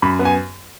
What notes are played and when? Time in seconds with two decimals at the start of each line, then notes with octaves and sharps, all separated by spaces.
0.02 F#2 B5
0.19 B3
0.25 G#5